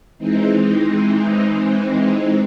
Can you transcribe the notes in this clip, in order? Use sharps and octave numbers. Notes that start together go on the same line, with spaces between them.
E3 G#3 C4 D#4